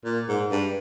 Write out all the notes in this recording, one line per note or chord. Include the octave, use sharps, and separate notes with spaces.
A#2
G#2
G2